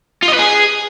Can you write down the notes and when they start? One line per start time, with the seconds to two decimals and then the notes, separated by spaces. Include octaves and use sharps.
0.22 F4
0.28 D#5
0.33 B4
0.39 G#4